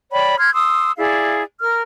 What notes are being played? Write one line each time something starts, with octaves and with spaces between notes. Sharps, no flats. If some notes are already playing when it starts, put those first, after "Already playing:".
C#5 D5 G5 B5
C6 F6 G#6
C6 D#6 E6
E4 G#4 D5 F5
A#4 F6